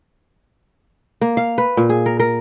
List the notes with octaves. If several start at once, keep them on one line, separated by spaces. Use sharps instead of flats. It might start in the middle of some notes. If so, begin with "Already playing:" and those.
A#3
F5
B4
A#2
G#4
A#4
A#4